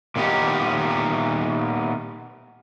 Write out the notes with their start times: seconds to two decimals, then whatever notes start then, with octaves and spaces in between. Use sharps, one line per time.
0.16 A#2 D#3 B3 D#4 G4